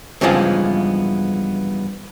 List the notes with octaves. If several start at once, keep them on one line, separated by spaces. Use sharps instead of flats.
G2 C#3 E3 F3 G#3 B3